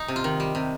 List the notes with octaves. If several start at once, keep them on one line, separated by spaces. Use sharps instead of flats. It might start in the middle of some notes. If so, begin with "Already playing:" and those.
Already playing: D#4
C3
F4
D#3
G3
C3